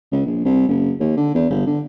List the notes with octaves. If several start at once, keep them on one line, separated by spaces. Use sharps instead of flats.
C#2
A#1
C2
F#1
D#2
D3
E2
G1
D3